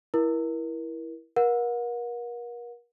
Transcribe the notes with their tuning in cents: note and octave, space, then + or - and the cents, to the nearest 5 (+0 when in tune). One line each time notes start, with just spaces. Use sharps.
E4 +0 A#4 +30
A#4 +40 F#5 -35